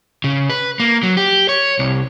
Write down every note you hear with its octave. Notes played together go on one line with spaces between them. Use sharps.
C#3
B4
A#3
F#3
G4
C#5
C2